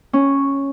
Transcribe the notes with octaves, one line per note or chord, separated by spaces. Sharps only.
C#4